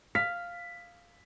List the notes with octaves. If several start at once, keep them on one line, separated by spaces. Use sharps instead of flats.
F5 B6